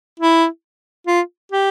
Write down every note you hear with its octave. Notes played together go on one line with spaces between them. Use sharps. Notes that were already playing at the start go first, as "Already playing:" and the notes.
E4
F4
G4